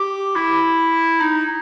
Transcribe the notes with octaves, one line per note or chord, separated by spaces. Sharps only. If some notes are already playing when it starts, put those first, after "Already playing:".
Already playing: G4
E4
D#4